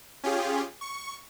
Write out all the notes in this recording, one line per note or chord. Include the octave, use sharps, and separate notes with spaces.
C#4 F4 G4 G#4
C#6